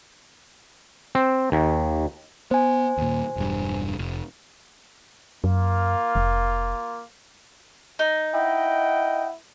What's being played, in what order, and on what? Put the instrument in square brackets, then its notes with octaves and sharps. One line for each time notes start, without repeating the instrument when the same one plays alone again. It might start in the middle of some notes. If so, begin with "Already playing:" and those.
[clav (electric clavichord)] C4
D#2
[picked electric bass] B3 [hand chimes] C5 G#5
[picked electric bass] D#2 A#2
E1 G2
F1
[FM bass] F#2 [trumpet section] A#3 F4
[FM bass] F1
[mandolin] D#4
[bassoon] E4 [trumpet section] D#5 F#5 G5